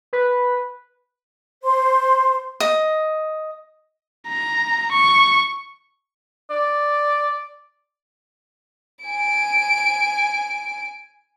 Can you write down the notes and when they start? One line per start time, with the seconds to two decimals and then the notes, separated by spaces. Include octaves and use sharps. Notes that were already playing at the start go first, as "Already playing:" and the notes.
0.13 B4
1.64 C5 C6
2.60 D#5
4.27 A#5
4.92 C#6
6.50 D5
9.05 G#5 D7